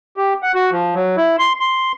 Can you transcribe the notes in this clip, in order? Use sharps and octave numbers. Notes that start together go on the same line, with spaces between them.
G4
F#5
F#4
F3
F#3
E4
C6
C6